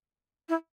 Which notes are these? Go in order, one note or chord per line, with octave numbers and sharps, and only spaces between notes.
E4